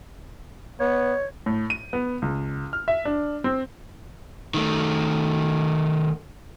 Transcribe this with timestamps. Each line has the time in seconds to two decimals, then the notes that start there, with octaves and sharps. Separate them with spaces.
0.80 B3 C#5
1.46 A2
1.70 D#7
1.93 B3
2.22 C#2
2.73 F6
2.88 E5
3.05 D4
3.44 C4
4.54 D#3 A3